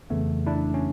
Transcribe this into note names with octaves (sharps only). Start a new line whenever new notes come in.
F2 C#3 E3 A3 B3
D4 E4
C#4